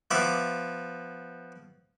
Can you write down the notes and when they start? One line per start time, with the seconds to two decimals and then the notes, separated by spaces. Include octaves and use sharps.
0.11 F3 B3 E5 D6